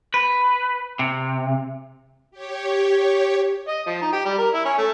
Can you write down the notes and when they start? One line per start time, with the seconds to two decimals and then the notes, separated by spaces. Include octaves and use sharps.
0.14 B4
0.99 C3
2.31 G4 C#5
3.68 D#5
3.87 F3
4.01 D#4
4.13 G4
4.25 G3
4.38 A#4
4.54 E4
4.65 C#4
4.78 A3